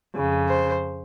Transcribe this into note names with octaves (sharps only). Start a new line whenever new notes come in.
F2 C#3
C5